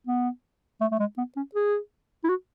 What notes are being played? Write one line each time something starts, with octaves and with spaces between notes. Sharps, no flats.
B3
A3
A3
G#3
B3
C#4
G#4
E4
F#4